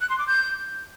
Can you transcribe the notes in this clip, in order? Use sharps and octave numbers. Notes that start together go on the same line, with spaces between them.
F#6
C6
D6
G6